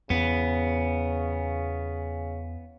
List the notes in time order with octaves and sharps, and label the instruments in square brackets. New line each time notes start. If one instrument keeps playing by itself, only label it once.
[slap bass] E2 [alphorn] C#3 [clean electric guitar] B3